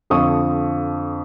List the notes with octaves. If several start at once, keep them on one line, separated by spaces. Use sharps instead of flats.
F2 D3 F3 C#6 D#6